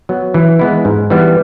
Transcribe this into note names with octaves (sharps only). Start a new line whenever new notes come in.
F#3 B3
E3
G#3 B3 E4
G#2
E3 G3 B3